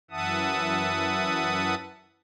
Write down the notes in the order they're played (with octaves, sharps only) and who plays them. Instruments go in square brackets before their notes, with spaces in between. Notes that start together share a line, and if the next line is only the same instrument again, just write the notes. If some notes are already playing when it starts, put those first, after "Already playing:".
[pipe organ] F#2 E3 E5 F#5 A5 D#6